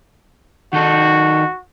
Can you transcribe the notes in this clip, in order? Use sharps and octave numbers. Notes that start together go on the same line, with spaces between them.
D#3 D#4 F#4 A4